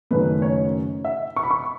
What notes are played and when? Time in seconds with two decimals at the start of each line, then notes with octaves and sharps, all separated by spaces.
0.11 F#1 F#2 D#3 A3 B4
0.42 C#5
1.05 E5
1.36 C#6
1.43 B5
1.51 C#6